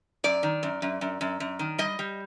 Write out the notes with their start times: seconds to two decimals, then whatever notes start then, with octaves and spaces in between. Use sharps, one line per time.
0.24 F#2 D5
0.43 D#3
0.63 F#2
0.82 F#2
1.01 F#2
1.21 F#2
1.40 F#2
1.59 D#3
1.78 G3 D#5
1.99 G3